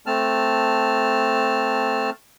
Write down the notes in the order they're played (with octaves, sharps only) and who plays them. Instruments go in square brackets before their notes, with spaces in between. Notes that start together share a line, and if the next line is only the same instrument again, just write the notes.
[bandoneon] A3 C4 A5 F6